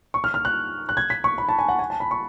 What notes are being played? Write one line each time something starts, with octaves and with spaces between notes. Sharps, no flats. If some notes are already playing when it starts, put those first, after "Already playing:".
C#6
F6
F6
F#6
F#6
G#6
B6
C#6
B5
A5
G#5
F#5
G#5
A5
B5
C#6